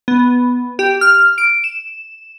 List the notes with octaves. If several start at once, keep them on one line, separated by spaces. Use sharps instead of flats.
B3
G4
F6
D7
E7